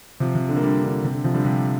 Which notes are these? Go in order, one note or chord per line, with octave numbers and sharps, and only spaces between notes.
C3 F3
C3
D3
A#3
D3 G3
D3
C3
D3
C3 F3
D3 G3
C3 F3